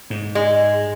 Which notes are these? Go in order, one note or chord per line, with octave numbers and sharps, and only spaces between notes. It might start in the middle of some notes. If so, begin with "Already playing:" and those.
G#2
G#3